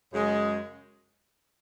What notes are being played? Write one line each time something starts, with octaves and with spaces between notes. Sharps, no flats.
F#2 C#3 G#3